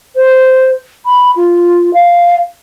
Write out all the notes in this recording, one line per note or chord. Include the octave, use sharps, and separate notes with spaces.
C5
B5
F4
F5